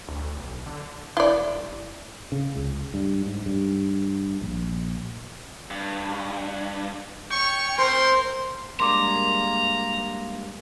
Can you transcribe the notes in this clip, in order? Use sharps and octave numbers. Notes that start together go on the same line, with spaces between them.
D2
B1
D3
E1 E4 D5
G1
C#3
C#2
G2
G#2
G2
A#1
G2
C#5 G5 C#6
C4 A#4 C5 C6
G3 G#3 A#3 D4 A#5 C6 D6